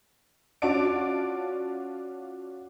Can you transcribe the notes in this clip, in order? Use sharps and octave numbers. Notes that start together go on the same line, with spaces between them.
C#4 F4 F#4 D5 A5 D7